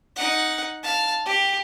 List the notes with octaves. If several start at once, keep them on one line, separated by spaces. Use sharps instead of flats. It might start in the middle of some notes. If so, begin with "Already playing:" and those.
D#4 F#5
F5 A5
G4